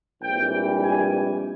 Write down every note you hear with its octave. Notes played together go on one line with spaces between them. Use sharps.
A#1 G#2 E3 G3 C4 G5
G#5